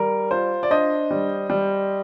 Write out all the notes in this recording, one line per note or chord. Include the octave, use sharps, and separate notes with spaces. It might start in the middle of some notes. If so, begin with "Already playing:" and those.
Already playing: G3 A#4
F4 C5
D5
D4 C5 D#5
G3
G3